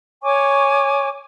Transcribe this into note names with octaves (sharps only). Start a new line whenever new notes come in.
C#5 G#5 C#6 D6